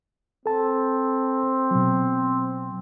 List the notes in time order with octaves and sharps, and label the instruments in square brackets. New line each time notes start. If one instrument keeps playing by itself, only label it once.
[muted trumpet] C4 [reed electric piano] A4 A5
[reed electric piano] B2 F#3